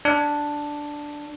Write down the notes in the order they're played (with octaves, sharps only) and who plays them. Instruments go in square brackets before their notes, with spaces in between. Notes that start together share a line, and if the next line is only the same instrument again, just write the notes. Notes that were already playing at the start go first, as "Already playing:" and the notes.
[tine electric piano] D4